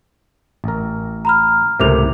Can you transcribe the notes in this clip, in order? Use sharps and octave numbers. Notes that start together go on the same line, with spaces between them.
A1 A#4
A#5 B5 F6
C#2 A2 C3 A#4 D6 F7